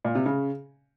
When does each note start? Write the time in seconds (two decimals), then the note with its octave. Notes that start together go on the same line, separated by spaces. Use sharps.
0.05 A#2
0.15 C3
0.26 C#3